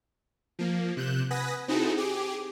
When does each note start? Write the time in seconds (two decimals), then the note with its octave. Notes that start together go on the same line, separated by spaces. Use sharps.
0.59 F3 A#3
0.97 C3 F#6 G6 E7
1.31 B4 F#5 G#5 D#6 A#6 B6
1.68 C4 D#4 E4 F#4 G#4 A4
1.97 G4 G#4 D6